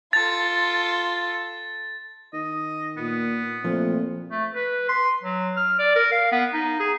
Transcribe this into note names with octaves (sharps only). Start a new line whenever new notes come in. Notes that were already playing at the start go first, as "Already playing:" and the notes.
F4 A4 A6
D#3 D#5
A#2 B3
A#2 F3 A3 C4
A3
B4
C6
F#3
F6
D5
A#4
F5
B3
D#4
G#4